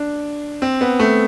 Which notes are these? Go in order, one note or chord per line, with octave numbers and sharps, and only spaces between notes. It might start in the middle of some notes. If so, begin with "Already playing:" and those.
Already playing: D4
C4
B3
A3